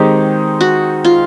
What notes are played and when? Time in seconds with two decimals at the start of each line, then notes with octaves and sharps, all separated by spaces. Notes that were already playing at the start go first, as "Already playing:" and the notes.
Already playing: D#3 G#3 C4 D#4 G4
0.61 F#4
1.05 F4